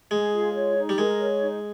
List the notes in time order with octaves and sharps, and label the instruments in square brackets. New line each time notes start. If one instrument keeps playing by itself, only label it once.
[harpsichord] G#3 [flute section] G#4
[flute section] F4
C#5
D#4
[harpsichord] G3
[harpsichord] G#3 [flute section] A#4
[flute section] C#5
D#4